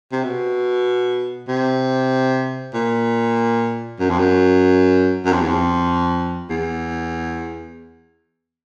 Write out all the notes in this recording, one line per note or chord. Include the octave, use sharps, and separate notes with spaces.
C3
B2
C3
A#2
F#2
F2
F#2
F#2
F2
E2
F2
E2